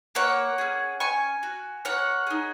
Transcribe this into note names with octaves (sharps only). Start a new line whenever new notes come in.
A#3 C#5 F#5
C#4 G#4
C#4 G#5 C#6
F#4
A#3 C#5 F#5
D#4 G#4